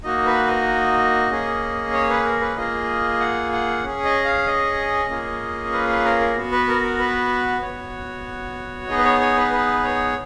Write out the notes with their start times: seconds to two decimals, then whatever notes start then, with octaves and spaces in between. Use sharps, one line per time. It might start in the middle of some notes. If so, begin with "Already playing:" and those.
0.04 A#3 D#4 F#4 D#5
0.26 B4
0.47 D#5
1.31 A#3 C#4 G#4
1.93 C#5
2.10 B4
2.25 A#4
2.41 B4
2.56 A#3 F4 G#4 D#5
3.20 F#5
3.52 F#5
3.83 C#4 G#4
4.05 D#5
4.25 F5
4.47 D#5
5.10 A#3 C#4 F4 G#4
5.73 B4
5.89 B4
6.05 A#4
6.20 A#4
6.36 B3 F#4
6.52 B4
6.68 A#4
6.83 A#4
6.99 B4
7.62 B3 F#4 C#5
8.88 B3 D#4 G#4 D#5
8.98 B4
9.05 C#5
9.21 C#5
9.37 B4
9.52 B4
9.84 C#5